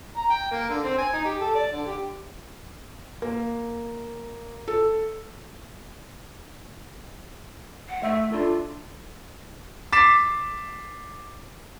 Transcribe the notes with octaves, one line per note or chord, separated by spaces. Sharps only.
A#5
G5
A#3
D3
C4
G#5
D#4
G4
A4
D5
D3
G4
A#3
A4
F#5
A3 E5
D4 F4 A4
D6 A6 B6 C7 E7